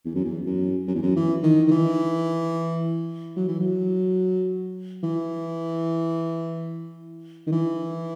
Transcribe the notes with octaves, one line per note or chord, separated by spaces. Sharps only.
E2
F#2
E2
F#2
F#2
E2
F#2
E3
D#3
D#3
E3
F#3
E3
F#3
E3
D#3
E3